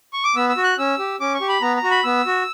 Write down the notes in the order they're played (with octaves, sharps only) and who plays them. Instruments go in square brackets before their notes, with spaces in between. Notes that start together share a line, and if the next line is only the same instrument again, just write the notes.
[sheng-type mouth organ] C#6
D6
B3 E6
E6
F#4
F#6
C#4 E6
G4
C#4 D6
C#6
G4
B5
B3 A#5
A#5
F#4
B5
B3 E6
F#4